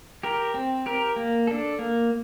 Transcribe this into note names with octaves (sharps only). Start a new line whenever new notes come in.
G4 A#4
C4
G4 A#4
A#3
D4 A4
A#3